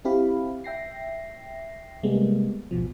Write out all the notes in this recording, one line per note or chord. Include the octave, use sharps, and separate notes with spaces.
C4 E4 G4 F5 B5
E5 G5 A#6 C7
C3 G3 G#3 A#3 B3
G#1 D2 B2 F3